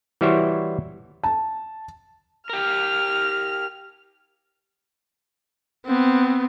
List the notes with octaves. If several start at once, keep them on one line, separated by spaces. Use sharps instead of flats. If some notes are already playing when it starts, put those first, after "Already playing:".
E3 G3 E4 F#4 C5 C#5
A5
G4 A#4 F6
B3 C4